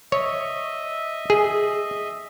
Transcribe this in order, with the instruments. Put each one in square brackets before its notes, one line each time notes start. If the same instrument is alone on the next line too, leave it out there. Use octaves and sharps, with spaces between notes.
[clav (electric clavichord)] C#5 [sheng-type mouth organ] D#5 E5
[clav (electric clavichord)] G#4